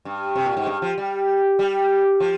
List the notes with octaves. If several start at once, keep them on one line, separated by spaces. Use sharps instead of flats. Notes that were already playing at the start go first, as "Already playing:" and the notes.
G2
C3
A#2
G#2
G2
F3
G3
G3
F3